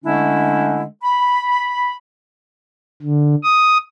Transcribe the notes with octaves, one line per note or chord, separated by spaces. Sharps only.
D3 G#3 A3 C#4 D4 E4
B5
D3
D#6